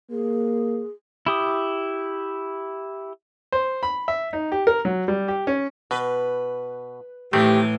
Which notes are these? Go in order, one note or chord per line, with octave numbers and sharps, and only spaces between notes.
A#3 G#4
E4 G4 D#6
C5
B5
E5
D#4
G4
A#4
F#3
G3
G4
C#4
B2 B4
A2 D#3 E3 A3 C4 G4